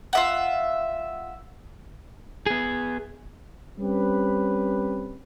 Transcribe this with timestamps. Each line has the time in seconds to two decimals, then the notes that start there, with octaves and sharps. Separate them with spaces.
0.13 F4 E5 F#5
2.46 B3 G#4
3.79 G3 C4 C#4 G4 B4